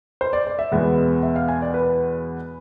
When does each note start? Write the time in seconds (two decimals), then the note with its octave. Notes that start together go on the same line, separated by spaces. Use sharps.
0.21 C5
0.33 D5
0.47 D5
0.59 E5
0.71 E2 B2 G#3 B3
1.23 E5
1.36 F5
1.48 G#5
1.62 D5
1.74 B4